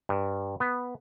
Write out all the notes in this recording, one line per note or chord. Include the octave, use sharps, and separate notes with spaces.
G2
B3